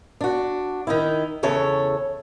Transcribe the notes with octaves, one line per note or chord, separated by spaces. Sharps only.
D4 F#4
D#3 D#4 E4
E2 C#3 A4 C#5 E5